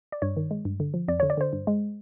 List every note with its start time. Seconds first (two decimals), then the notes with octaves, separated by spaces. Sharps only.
0.12 D5
0.22 G2 C#5
0.37 D#3
0.51 G#3
0.65 G2
0.80 D3
0.94 F3
1.08 F2 D5
1.20 D3 C#5
1.30 D5
1.37 D3 C5
1.53 G2
1.67 G#3